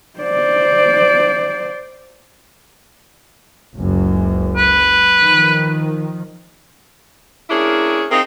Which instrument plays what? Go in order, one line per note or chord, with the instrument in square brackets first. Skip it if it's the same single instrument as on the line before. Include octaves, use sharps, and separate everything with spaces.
[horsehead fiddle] C5 D5
[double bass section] F#1 C#2 F#2
[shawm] B4
[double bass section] D#3 F3
[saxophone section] A#3 C#4 D4 E4 G#4
C4 D#4 F4 G#4 A#4